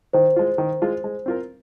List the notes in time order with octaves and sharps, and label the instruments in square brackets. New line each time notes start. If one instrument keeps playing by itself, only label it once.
[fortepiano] D#3 [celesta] C5
[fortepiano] G#3 F4
D#3
G#3 F4
G#3
C4 F4 A#4